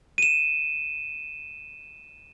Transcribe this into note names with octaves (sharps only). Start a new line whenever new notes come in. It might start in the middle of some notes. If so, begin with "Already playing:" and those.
D#7 E7